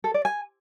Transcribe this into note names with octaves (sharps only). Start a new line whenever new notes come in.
A4
D5
G#5